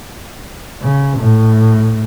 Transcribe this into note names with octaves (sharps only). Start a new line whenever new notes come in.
C#3
A2